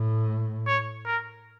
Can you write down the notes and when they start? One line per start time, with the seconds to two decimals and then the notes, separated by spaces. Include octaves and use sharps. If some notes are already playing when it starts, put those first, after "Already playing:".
Already playing: A2
0.66 C#5
1.05 A#4